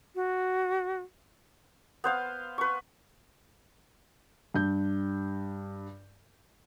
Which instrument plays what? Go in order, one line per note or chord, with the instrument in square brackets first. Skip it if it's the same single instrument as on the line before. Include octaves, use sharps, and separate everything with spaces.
[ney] F#4
[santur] B3 C5 F5
B4 C#6
[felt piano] G2 G6